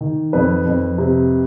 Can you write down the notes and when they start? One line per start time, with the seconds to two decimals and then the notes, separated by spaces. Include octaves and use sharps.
0.01 D#3
0.33 F2 B4
0.66 F2
0.98 C3